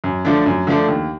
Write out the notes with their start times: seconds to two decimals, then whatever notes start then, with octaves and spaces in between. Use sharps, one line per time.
0.04 F#2
0.25 D3 F3 A3 D4
0.46 F#2
0.67 D3 F3 A3 D4
0.88 D#2